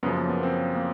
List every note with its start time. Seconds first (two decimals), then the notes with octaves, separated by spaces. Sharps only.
0.03 F#2 C#3 F3 B3
0.16 A#3
0.29 B3
0.43 C4
0.75 A#3